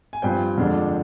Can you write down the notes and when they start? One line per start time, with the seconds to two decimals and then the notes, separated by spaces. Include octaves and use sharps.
0.13 G#5
0.22 G2 F3 C4 G5
0.58 F2 D3 G#3 D4